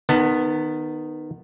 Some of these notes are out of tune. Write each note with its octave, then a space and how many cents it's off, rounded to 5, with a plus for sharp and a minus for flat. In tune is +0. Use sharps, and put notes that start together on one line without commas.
D#3 -15 B3 +5 A5 +30